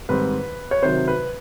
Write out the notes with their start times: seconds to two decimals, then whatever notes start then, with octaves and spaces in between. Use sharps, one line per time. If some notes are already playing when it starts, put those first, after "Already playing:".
0.09 G#2 D#3 G3 C4 B4
0.71 C#5
0.83 C3 D#3 F#3 C5
1.08 B4